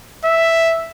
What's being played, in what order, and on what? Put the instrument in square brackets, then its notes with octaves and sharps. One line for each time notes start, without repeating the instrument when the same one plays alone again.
[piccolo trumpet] E5